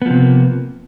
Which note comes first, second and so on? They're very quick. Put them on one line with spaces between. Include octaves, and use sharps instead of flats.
B3 F3 C3 A#3